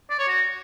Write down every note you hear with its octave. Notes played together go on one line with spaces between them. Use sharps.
D5
C#5
F#4